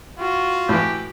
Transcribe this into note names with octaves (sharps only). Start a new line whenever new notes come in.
F4 F#4
A2 E3 G4